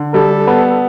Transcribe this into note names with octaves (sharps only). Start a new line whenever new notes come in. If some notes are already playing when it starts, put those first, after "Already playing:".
Already playing: D3
G3 A4
B3